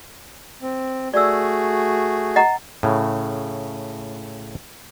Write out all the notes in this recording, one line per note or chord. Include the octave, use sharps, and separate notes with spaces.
C4
A3 F#4 G#4 D5 E6
D#5 F#5 A#5
A2 C#3